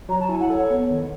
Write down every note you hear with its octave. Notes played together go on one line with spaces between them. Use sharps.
F#3 A#5
A5
E4 G#5
F#5
A4 C#5
B3
D#3